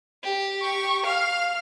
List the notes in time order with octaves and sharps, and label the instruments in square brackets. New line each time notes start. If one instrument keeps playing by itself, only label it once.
[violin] G4
[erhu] C#6
[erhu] F5 [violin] F6